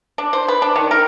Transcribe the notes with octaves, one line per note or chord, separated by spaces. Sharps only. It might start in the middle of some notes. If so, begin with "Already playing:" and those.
D4
C5
B4
D4
D#3
A#4